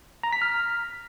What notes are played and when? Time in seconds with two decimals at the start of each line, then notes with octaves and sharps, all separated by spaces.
0.23 A#5
0.33 B6
0.42 F6